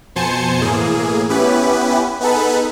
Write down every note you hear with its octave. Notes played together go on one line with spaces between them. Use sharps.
F2 B2 C5 G#5 A5 C#7
A2 E3 A#3 G#4
B3 C#4 E4 G4 B4
B3 D#4 G#4 A4 B4